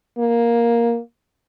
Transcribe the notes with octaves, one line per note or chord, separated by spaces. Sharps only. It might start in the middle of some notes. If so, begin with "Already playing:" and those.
A#3